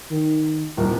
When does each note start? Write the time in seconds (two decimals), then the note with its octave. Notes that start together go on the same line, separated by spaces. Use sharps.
0.10 D#3
0.77 D#1 C2 A#4